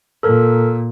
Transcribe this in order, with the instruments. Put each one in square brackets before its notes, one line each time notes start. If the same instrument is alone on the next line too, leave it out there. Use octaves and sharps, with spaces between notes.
[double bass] A#2 [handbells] A4 A#4